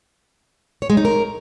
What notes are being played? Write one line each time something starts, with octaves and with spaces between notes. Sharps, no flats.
C#5
G#3
D#4
A#4